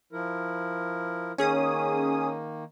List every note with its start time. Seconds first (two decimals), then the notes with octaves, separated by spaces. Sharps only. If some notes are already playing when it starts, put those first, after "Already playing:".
0.13 F3 E4 A#4
1.38 D#3 A#3 C#4 G#4 D#6